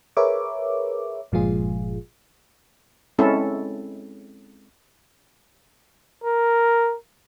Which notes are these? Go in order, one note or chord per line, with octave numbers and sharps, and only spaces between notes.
G#4 A#4 B4 C#5 E5 D6
G1 A#2 F3 G#3 F4 G#4
G#3 C4 C#4 E4 A4
A#4